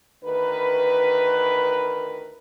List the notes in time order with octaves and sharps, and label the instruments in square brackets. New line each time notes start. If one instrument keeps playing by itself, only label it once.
[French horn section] D2 D#3 A#4 B4